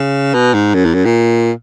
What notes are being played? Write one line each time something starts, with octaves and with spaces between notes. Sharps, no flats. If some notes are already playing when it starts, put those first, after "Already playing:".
Already playing: C#3
B2
G#2
F#2
E2
F#2
A#2